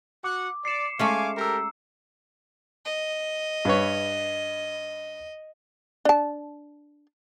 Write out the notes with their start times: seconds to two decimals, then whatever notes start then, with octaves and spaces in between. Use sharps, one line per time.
0.24 F#4 F#5 D6
0.65 D5 C7 C#7 E7
0.99 G#3 A3 C#4 F5 G#5 D6
1.37 G4 A4 A#4 A#5 E6
2.85 D#5
3.65 G2 B4 C#5
6.05 D4 A5